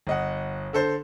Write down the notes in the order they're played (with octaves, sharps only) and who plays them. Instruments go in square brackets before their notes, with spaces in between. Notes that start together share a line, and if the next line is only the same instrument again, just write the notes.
[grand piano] G1 D#5 F#5
D3 A4 C5